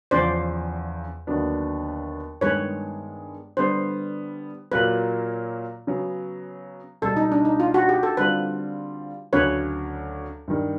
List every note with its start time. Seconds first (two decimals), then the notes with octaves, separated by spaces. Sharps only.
0.11 E2 C#3 F3 C5 D5
1.27 D#2 D3 F#3 B3 D4
2.41 G2 D#3 G#3 B3 B4 C#5
3.57 D3 G3 B3 C5
4.72 A#2 F#3 A#3 B4
5.87 C#3 F#3 B3
7.02 C#2 B2 G3 A4
7.17 D#4
7.32 D4
7.45 D#4
7.60 F4
7.74 F#4
7.89 G4
8.03 A4
8.17 D3 G3 C4 F4 B4
9.33 D2 C#3 F#3 B4 C#5
10.48 G2 D#3 G3